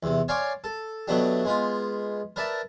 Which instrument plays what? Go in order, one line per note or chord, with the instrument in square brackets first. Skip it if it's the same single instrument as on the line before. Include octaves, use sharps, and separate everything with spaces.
[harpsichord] E2 C3
C#5 D5 F5 G#5 C6 D6
A4
B2 F#3 A3 B3 D4 G4
G#3 B3 F4
A#4 B4 D5 E5 A5